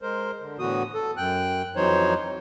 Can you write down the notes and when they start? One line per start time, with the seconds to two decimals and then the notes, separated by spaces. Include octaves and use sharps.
0.02 G#3 A#4 C5
0.42 D3
0.59 A2 D3 E3 B3 F#4 D#6
0.94 A4
1.17 F#2 G5 F#6
1.76 F2 E3 F#3 D#4 C5 C#5